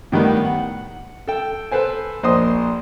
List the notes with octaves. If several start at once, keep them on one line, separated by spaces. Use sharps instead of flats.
A2 D#3 G3 B3
F#5
A4 G5
A4 B4 C5 G#5
A#1 C5 D#5 C6 D#6